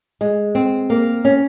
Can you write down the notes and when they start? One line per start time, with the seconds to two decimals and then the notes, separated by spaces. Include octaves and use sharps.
0.21 G#3
0.55 C4
0.90 A#3
1.25 C#4